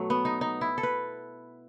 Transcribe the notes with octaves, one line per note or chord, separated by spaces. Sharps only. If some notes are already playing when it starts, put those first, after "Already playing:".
Already playing: B2 F#3 A3
B3
D#4
D#4
E4
A4
B4